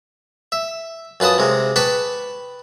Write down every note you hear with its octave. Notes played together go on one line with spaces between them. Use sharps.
E5
F#2 F4 B4 A5 D#6
C3 G#3
B4 G5 A5 B5 C#6 D6